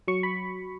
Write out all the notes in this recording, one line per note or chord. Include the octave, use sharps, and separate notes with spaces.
F#3 C#6
B5